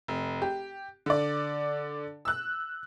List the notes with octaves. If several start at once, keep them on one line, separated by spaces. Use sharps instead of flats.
F1
G4
D3 D5
E6 F#6